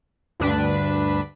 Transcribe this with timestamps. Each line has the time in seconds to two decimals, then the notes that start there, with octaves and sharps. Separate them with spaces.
0.40 D2 G2 D4 B4 B6